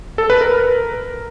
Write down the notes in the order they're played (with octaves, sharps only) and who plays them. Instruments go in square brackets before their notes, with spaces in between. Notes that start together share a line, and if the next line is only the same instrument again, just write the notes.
[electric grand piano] A4
B4
A#4